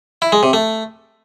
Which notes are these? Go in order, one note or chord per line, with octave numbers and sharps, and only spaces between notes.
E4
G#3
C3
A3